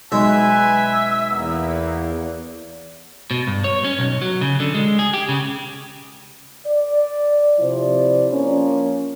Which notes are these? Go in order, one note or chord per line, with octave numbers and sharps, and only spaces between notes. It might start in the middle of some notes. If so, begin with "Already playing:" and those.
B1 G#3 B4 E5 G#5
E2 A#3 B3
B2
G2
C#5
C#4
B1
F#3
C#3
D3
G#3
G#4
G4
C#3
D5
C3 F3 E4 C5 D5
F3 A#3 C#4